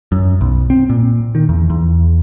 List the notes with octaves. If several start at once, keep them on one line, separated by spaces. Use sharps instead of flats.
F#2
B1
C4
A#2
D#3
E2
E2